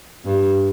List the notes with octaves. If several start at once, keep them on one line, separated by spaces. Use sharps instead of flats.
G2